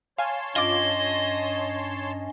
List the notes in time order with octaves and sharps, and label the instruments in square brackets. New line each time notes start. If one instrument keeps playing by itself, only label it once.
[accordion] C#5 A5 C6 [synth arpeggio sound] F5 G#5
[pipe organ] G2 C#4 [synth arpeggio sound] F4 D6 [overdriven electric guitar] D#5